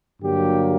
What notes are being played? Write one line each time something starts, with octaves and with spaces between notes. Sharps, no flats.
G2 D3 F#3 A#3 G4